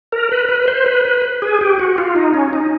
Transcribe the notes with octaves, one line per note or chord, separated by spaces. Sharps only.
A#4
B4
B4
C5
B4
B4
G#4
G4
F#4
F4
D#4
C#4
D#4